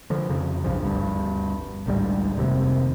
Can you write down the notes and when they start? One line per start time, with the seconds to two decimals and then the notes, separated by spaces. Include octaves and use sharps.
0.10 D3 F3
0.29 F2 C#3
0.64 B1 G2 F3
0.81 G1 D2 G2
1.86 A1 D2 G#2 G3
2.36 F1 D#2 C3